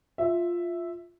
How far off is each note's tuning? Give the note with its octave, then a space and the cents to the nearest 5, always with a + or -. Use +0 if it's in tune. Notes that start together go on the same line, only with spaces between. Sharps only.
F4 +0 E5 +0